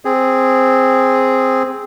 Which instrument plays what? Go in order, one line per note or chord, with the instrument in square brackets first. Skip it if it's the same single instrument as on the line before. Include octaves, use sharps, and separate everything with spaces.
[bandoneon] C4 G#4